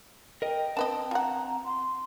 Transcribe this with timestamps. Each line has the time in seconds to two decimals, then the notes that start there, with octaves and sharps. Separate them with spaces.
0.42 A#4 D#5 G5
0.77 C4 D4 B4 D#5 A5
1.11 F4 F#5 A#5
1.65 C6